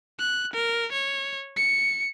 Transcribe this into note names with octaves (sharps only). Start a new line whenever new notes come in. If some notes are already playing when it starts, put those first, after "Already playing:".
F#6
A#4
C#5
C#7